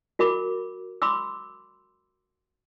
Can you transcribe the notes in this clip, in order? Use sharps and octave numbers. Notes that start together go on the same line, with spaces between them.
F#4 A#4 B5 D6
B5 C6 D6 E6